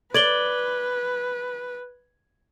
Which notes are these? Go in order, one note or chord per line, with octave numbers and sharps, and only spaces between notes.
B4 D5 G#6 F#7 G7